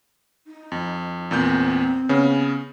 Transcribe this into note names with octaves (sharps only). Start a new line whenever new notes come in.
D#4
F2
E2 A#2 C4 G6
C#3 B3 C#4